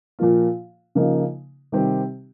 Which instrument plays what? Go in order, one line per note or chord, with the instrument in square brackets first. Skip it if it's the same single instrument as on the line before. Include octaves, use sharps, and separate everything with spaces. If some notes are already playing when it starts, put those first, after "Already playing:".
[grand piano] A#2 F3 A#3 F4
C#3 F3 A#3 D#4
C3 D#3 G3 C4 G4